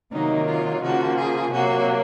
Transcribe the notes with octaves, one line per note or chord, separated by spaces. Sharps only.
C3 D#3 F#3 A#3 D#4
F4
C#3 F3 A#3 F#4
G#4
C3 F#3 A#3 F#4